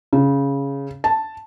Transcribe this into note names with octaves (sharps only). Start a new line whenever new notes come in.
C#3
A5